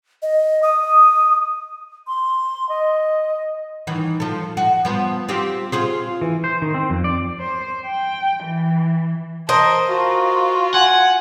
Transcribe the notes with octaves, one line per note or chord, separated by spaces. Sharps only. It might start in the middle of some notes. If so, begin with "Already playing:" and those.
D#5
D#6
C6
D#5
D#3 E3
F3 A4
F#4
F3 B3
C4 F4 G4
F4 G#4 C5
E3
C5
D#3
C4
F2
D5
C5
G5
E3
A#4 C5 D#5 A5
F4 F#4
F#5 G#5